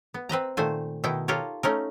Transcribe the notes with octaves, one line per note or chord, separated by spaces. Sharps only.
B3
C4 B4 D#5 A#5
A#2 D#3 A3 C5 G#5
B2 D#3 D#4 E4 G5
F4 G4 A4 A#4 C#5
A3 C#4 D#4 A#4